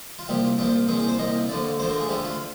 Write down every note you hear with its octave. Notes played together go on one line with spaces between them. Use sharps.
F4
C2 A#2 F3 G4
C2 A#2 F3 F4
C2 A#2 F3 G#4
G#4
C5
C2 A#2 F3 D#5
D2 D3 F3 D5
D2 D3 F3 C5
A#4
G#4
D2 D3 F3 G4
F4